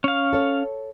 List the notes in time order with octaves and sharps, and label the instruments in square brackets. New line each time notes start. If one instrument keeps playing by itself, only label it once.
[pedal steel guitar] C#4 F5
[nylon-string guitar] A4 C#5